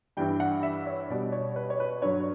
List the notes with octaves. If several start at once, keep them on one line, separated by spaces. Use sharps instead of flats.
G2 E3 G3 G5
F#5
E5
C#5
B2 G3 D5
C#5
B4
C#5
B4
G2 F#3 C#5